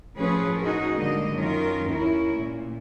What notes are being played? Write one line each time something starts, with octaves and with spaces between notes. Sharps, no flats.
A2 F3 C#4 G#4 B4
D#4 F#4 G#4 A#4
D3 G3 G#3 A#3 D#5
F#2 D#3 C#4 F4 A#4
D#2 C#4 E4 A#4
A#2